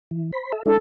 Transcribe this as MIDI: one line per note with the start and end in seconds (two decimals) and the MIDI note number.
0.11 0.31 52
0.33 0.52 72
0.33 0.52 83
0.52 0.63 69
0.52 0.63 76
0.66 0.78 56
0.66 0.78 62
0.66 0.78 64
0.66 0.75 69